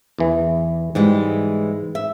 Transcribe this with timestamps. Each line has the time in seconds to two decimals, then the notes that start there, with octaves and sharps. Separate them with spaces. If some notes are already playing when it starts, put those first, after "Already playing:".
0.19 E2 E3
0.95 G#2 E3 G3 G#3
1.95 E5